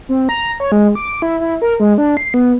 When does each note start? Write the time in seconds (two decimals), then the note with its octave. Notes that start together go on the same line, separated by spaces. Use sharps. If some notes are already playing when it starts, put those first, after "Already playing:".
0.09 C4
0.29 A#5
0.60 C#5
0.72 G#3
0.95 D6
1.22 E4
1.40 E4
1.62 A#4
1.80 G#3
1.98 D4
2.17 C7
2.34 B3